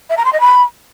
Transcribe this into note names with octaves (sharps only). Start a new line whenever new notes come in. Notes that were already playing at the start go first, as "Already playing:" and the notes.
E5
A#5
C6
D#5
B5